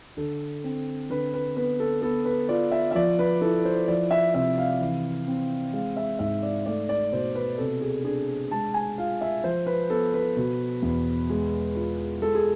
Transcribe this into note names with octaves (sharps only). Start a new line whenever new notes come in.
D3 A4
C4
D3 B4
B4
B3 B4
A4
B3 A4
B4
F4 D5
E5
E5
F3 D5
B4
E4 A4
C5
F3 D5
E5
C3 E5
F5
E3
C4
G#3 F5
E5
G#2 E5
D5
A3 D5
D5
B2 C5
B4
C3 A4
G#4
D4 G#4
G#3 A5
G#5
F4 F5
E5
F3 C5
B4
B3 A4
B4
B2
E2
G#3
F4
G#3 A4
G#4